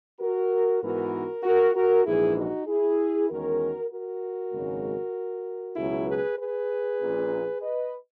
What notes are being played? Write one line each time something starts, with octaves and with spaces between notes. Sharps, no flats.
F#4 A#4
G#2 E3 B3 D#4 F#4 A#4
F#4 A#4
F#4 A#4
A#1 G#2 E3 E4 G#4
D#4 F#4
E4 G#4
E2 D#3 G#3 C#4 F#4 A#4
F#4 A#4
G#1 F#2 C#3 G#3
C#2 B2 F#3 E4 G#4
G#4 B4
G#4 B4
A#1 A#2 A#3 C#4
B4 D#5